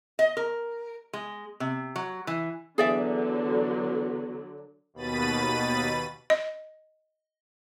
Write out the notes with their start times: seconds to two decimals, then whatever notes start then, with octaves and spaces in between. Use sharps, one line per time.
0.19 D#5
0.37 A#4
1.13 G#3
1.60 C3
1.96 F#3
2.27 E3
2.78 E2 D3 F#3 G#4 D5 E5
4.94 D#2 B2 B5 A6 D#7
6.30 D#5